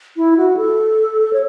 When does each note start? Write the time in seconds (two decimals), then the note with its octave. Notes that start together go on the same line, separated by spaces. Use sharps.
0.17 E4
0.37 F#4
0.57 A4
1.33 C#5